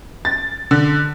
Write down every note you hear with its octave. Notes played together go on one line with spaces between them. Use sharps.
A6
D3